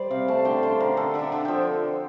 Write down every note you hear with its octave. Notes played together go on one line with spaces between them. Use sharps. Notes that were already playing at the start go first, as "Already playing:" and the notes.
Already playing: G3 C5 D5
C3 F5
A3 A5
D3 G5
D3 C5
D3 A#4
D3 A4
D3 E5
D3 E5
F3 G5